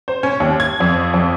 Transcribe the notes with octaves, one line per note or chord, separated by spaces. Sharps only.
C5
C#4
D#2
G#6
F2
F2